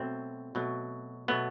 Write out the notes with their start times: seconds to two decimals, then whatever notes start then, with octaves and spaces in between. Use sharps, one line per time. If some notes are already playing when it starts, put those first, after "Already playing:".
Already playing: B2 F#3 A3 C4
0.55 B2 F#3 A3
1.28 B2 F#3 A3 B3